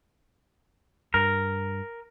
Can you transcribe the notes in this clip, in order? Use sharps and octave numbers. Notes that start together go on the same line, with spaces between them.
G2 A#4